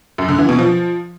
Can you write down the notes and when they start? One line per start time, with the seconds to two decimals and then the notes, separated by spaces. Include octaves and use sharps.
0.18 F#2
0.28 D3
0.39 E3
0.49 B2
0.59 F3